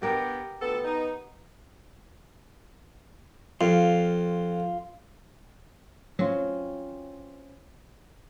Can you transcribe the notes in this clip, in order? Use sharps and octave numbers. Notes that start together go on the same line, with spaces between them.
G2 G3 B3 G4 A#4 G5
D2 B3 A4
D#4
F2 F4
F#3 C4 C#4 F4